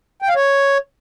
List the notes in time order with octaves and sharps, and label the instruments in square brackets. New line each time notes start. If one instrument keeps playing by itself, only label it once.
[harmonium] G5
F5
C#5